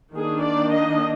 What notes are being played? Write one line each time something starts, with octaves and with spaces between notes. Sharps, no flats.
D#3 A#3 D4 G#4
D5
D#5